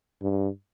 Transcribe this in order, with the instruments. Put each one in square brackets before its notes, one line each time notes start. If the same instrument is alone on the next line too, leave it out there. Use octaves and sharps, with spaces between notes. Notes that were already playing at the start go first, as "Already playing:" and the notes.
[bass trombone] G2